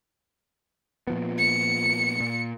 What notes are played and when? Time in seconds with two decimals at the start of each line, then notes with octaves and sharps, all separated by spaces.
1.07 A#2 F3 B3
1.38 C#7
2.20 A#2